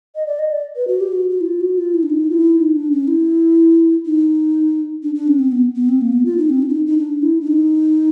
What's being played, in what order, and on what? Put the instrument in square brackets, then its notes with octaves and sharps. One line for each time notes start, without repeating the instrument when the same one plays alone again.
[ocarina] D#5
D5
D#5
D5
B4
F#4
G4
F#4
F#4
E4
F4
F#4
F4
E4
D4
D#4
F4
E4
D#4
D4
C#4
E4
D#4
D4
D4
C#4
C4
B3
B3
C4
A#3
B3
F4
D#4
C4
D4
E4
D#4
D#4
D4
E4
D4
D#4